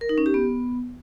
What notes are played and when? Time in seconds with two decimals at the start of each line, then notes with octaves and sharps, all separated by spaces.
0.01 A#4
0.09 D#4
0.18 C#4
0.26 G4
0.34 B3